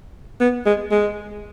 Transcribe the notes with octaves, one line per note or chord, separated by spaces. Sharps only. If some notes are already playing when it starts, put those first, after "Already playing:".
B3
G#3
G#3